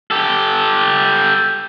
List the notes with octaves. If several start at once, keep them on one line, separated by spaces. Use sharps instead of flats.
G4 A4